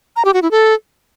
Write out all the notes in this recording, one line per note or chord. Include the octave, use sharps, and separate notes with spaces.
A#5
G4
F#4
E4
A4